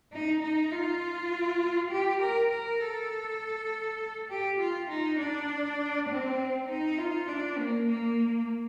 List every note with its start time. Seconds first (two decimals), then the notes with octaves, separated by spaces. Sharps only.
0.12 D#4
0.42 D#4
0.72 F4
1.90 G4
2.21 A#4
2.51 A#4
2.81 A4
4.30 G4
4.59 F4
4.89 D#4
5.18 D4
6.09 C4
6.68 D#4
6.98 F4
7.28 D4
7.58 A#3
7.87 A#3